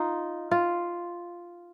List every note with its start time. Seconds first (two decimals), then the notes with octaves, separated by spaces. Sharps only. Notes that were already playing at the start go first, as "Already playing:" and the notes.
Already playing: D#4 F4
0.51 F4